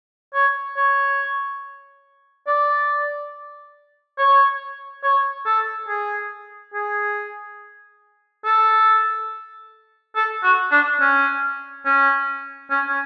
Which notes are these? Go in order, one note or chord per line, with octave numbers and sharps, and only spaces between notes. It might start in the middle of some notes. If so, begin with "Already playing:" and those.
C#5
C#5
D5
C#5
C#5
A4
G#4
G#4
A4
A4
F#4
D4
C#4
C#4
C#4
C#4